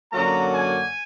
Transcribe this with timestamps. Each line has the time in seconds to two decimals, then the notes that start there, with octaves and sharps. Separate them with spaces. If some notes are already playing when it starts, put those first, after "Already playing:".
0.12 F#2 D3 F#3 A#3 A#5
0.54 G#5